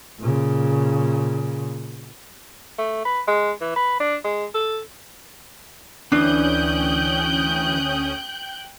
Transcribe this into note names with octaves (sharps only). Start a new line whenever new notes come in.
A#2 C#3
A3
B4
G#3
E3
B4
D4
G#3
A4
D2 E3 C#4 D4 G5 D#6 F#6 G6